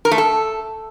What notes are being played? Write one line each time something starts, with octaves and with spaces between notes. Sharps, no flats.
A#4
A3
A4